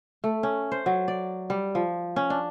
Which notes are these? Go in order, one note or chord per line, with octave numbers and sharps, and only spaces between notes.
A3
C#4
C5
F#3
D5
G3
F3
C#4
D4